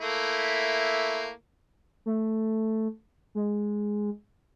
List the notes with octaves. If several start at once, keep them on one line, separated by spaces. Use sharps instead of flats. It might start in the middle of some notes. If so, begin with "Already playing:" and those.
A3 A#3 E4
A3
G#3